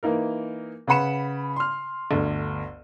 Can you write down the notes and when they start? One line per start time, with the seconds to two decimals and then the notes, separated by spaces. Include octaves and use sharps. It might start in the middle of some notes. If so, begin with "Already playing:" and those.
0.03 E3 A#3 D#4 A#4
0.87 C#3 B4 F#5 B5 C#7 E7
1.56 C6 F6
2.11 G1 D2